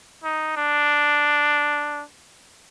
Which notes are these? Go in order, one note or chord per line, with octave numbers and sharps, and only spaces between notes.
D#4
D4